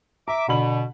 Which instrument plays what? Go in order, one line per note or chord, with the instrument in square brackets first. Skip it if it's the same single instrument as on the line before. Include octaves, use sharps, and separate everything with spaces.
[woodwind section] E5 D6 [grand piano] A#5
[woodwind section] B2 [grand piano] D3 B5 F#7